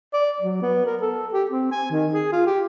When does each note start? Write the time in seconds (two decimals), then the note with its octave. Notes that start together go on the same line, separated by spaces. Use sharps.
0.13 D5
0.42 F#3
0.62 B3
0.86 A#4
1.01 A4
1.33 G4
1.50 C4
1.71 G#5
1.91 D#3
2.14 G#4
2.32 F4
2.46 G4